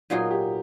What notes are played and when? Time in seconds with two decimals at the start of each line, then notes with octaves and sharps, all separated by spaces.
0.10 A#2 F#3 B3 D#4 F4 G#4
0.31 F4 G4